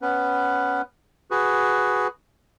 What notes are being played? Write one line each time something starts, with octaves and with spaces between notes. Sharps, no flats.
B3 C#4 B4
F#4 G#4 B4